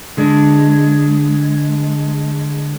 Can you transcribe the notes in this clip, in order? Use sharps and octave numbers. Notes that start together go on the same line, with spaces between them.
D3 G#3 D4